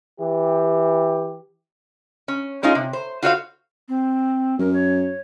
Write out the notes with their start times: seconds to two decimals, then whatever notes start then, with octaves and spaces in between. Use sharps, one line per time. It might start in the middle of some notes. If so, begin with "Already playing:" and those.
0.19 E3 G4
2.28 C#4
2.63 G#3 C#4 D#4 F4 G#4
2.75 C3
2.93 C5
3.23 F4 F#4 C5 C#5 D#5 F5
3.89 C4
4.59 F#2 A#4
4.74 C#5